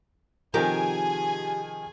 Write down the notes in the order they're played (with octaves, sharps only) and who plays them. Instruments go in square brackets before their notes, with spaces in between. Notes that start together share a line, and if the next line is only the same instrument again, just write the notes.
[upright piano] C3 D#3 F3 [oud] G4 A#4 [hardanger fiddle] G#4 G#5